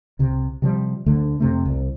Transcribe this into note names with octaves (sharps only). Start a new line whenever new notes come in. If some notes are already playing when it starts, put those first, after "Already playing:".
C2 C3
C3 F3 G3
D2 D3 A3
F2 C3 A3
C2